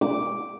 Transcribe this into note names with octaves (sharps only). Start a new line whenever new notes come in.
D6